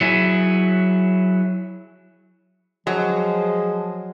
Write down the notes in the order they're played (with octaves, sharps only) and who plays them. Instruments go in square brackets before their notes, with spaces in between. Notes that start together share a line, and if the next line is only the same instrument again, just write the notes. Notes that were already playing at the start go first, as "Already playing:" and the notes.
[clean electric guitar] F#3 E4 G#4
[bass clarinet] F3 [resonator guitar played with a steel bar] F#3 [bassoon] G#3